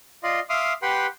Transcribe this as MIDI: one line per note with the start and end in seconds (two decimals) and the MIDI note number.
0.23 0.40 65
0.23 0.40 74
0.23 0.40 75
0.23 0.40 77
0.23 0.40 84
0.50 0.73 76
0.50 0.73 77
0.50 0.73 84
0.50 0.73 86
0.50 0.73 87
0.50 0.73 89
0.82 1.07 67
0.82 1.07 71
0.82 1.07 78
0.82 1.07 79
0.82 1.07 83
0.82 1.07 84